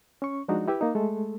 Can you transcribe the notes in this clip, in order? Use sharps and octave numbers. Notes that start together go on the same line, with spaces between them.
C#4 C#6
F3 G#3 D4 D#4 F#4
E4 G4 B4 E5
A#3 D#4
G#3 A3 A4